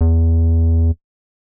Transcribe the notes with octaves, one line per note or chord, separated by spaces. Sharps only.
E2